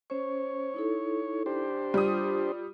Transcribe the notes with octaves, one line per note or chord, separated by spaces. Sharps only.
C#4 C5 C#5
D#4 E4 A4
D4 G4 C5
G3 F4 D#6